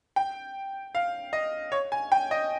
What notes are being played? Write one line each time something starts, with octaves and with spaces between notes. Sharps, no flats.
G5
F5
D#5
C#5
G#5
G5
D#5